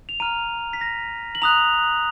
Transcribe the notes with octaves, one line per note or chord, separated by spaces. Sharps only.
F7
A#5 F6 D#7
B6
A#6
F#7
A#5 D#6 F#6 F7